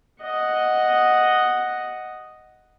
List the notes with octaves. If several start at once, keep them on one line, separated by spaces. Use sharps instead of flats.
D#5 F#5